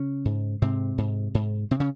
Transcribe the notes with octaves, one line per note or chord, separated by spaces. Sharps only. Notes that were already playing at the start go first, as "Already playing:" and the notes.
Already playing: C#3 C#4
G#2
G#2 C3 C4
G#2
G#2
C3 C4
C#3 C#4